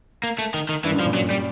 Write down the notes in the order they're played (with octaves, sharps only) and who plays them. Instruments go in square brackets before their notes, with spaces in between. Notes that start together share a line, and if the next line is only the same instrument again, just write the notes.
[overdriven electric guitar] A#3
A3
D#3
D#3
[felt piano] G2 [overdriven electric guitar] E3
[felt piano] F#2
G2
[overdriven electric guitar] F3
[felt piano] A#2
[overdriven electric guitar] F#3
G3